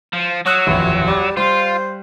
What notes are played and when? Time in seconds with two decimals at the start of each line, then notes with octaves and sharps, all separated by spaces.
0.13 F3
0.46 F#3 C#5 D#6 E6 F#6
0.67 D#1 A1 F2
1.07 G3 D6
1.37 G3 F4 C5